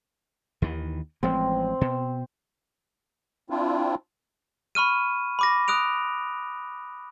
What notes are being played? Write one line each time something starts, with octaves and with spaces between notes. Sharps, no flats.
D#2 D#3 E3
A1 F3 G#3 C4
B2
C4 D4 E4 F4
B5 C#6 F6 D#7
B5 D6 A#6
D#6 F#6 D7 F7